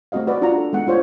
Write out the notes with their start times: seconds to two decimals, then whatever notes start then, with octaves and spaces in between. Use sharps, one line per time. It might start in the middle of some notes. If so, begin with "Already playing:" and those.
0.12 A3 C4 F#4 D#5 F5
0.27 F#4 B4 D5
0.42 D4 F4 D5 F#5 A#5
0.58 A4
0.73 G#3 B3 F#5
0.87 D4 F4 C5 C#5